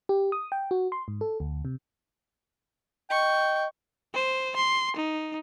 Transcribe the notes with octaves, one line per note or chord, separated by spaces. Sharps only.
G4
D#6
G5
F#4
C6
G#2
A4
D2
C3
D#5 G5 C#6
C5
C6
D#4